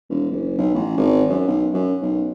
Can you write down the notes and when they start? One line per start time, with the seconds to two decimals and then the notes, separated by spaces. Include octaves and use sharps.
0.10 E1
0.31 F#1
0.58 B1
0.74 A1
0.97 G#1
1.29 F#2
1.47 B1
1.74 F#2
2.02 B1